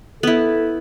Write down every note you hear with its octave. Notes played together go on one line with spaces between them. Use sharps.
B3 E4 A4